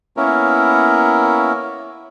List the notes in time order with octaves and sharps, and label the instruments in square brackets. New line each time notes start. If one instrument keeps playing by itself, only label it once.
[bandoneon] A#3 B3 C#4 E4 A#4